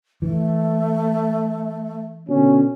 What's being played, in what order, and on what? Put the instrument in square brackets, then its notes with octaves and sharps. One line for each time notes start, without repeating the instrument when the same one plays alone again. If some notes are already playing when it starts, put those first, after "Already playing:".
[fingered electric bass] E3 [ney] A3
[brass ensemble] B2 D3 C#4